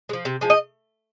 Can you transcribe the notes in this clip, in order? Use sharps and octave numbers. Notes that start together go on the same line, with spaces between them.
G#3
F3
C3
F3 G#3
D#5